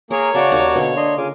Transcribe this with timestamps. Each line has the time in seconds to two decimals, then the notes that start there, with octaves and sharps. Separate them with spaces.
0.11 A#3 G#4 A#4 C#5
0.35 C#3 C#4 F#4 D5 A5
0.52 D#2 D#4
0.75 B2 D3 A#3
0.97 D4 D#5 C6
1.18 C#3 F4 G#5 D6